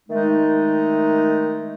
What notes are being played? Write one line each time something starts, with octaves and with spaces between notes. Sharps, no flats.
D#3 G#3 A3 D#4